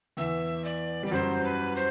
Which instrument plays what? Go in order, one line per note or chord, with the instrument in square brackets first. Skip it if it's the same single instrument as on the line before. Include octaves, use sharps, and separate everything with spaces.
[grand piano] E2 E3 [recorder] E5
[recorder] D5
[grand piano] G3 [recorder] D5
[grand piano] F#2 F#3 [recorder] C5
[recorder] B4
C5